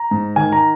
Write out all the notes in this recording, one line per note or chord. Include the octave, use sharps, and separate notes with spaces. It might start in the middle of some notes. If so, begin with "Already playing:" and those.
Already playing: A#5
G#2
D#3 G#5
A#5